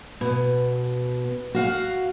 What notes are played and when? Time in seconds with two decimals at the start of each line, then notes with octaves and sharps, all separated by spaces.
0.21 B2
1.54 F#4 F5 F#5